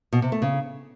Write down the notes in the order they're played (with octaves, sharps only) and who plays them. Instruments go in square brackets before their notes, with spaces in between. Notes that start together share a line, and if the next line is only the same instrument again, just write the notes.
[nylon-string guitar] B2
C3
A3
C#3